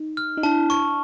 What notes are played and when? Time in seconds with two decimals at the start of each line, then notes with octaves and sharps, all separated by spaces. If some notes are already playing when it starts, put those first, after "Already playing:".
Already playing: D#4
0.17 F6
0.37 D#4
0.43 D4 E4 A5
0.70 C#6